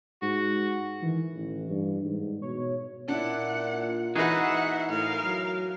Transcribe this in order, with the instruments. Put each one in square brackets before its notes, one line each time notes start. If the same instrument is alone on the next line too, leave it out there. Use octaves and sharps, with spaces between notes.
[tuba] G#2 [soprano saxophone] F#4
[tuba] D#3 [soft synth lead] E3
[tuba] A1
G2
G#2
[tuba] B2 [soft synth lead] C#5
[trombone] A#2 [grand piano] D4 E4 [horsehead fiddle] F#5
[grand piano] E3 B4 [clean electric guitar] D#4 F#4 G#4 [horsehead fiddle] E5 F#5
[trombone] A2 [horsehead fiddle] A#4 F5
[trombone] F#3